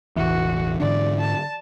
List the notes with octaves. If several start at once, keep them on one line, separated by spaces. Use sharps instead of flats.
E1 A1 E3 F#4
G#2 D3 D4 D5
A5